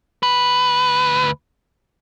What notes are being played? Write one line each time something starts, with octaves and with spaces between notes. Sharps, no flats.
D2 B4